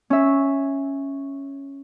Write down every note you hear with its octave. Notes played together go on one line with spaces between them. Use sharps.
C#4 E5